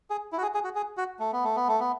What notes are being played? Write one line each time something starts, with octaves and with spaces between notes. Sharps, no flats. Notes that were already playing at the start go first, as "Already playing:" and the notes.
G#4
E4
F#4
G#4
G#4
F#4
G#4
F#4
A3
B3
A3
B3
A3
B3